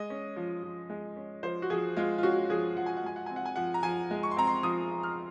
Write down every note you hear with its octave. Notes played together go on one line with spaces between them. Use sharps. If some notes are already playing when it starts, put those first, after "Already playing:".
Already playing: G#3 D#5
C#4
F3
F3
G#3
C#4
F3 C5
F#4
F3 G#4
G#3 F4
F4
C#4 F#4
F3 G#4
F3 F#5
G#5
F#5
G#3 G#5
F#5
C4 G#5
F#5
G#5
F3 F#5
A#5
F3 G#5
G#3
C#6
C6
C4 A#5
C6
F3 D#6
F3
F6